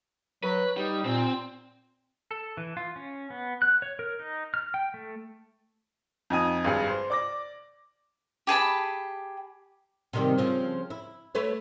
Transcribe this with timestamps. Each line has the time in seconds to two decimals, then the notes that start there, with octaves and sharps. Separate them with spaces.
0.44 F#3 B4
0.77 G3 D#4
1.05 A#2 C4
2.31 A4
2.57 E3
2.77 F4
2.96 C#4
3.30 B3
3.62 F#6
3.82 C#5
3.99 A#4
4.19 D#4
4.54 F6
4.74 G5
4.94 A3
6.30 F2 D#4 G#5 D#6
6.65 G#1 G2 G#4
6.89 C5
7.10 D5 D6 A#6
8.47 G4 G#4 A5 B5
10.13 C3 D#3 G3
10.38 C#3 F3 C4
10.90 E4
11.35 A3 B4 C#5